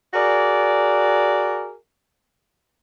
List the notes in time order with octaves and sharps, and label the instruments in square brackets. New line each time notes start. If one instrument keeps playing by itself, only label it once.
[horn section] F#4 G#4 A#4 D5